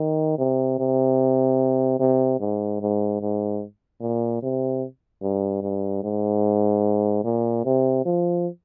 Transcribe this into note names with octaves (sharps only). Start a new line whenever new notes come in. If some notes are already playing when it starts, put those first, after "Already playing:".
Already playing: D#3
C3
C3
C3
G#2
G#2
G#2
A#2
C3
G2
G2
G#2
A#2
C3
F3